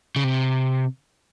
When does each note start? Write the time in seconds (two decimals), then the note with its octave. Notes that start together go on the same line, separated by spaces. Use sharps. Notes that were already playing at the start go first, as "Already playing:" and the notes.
0.16 C#3
0.24 C3